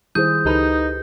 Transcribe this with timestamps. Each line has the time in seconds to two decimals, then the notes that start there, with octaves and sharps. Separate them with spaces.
0.15 D#3 G3 E4 G#4 C5 D#6 G6
0.45 C#2 D#4 G4 A4 B4